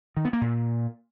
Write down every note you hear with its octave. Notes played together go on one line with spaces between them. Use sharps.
D#3
B3
A#3
A#2